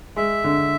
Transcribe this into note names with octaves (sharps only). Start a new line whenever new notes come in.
G#3 E5
D3